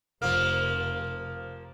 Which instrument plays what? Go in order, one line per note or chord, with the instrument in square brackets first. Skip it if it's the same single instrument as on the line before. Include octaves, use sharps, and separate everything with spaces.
[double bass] F1 [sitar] F3 A#3 [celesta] F6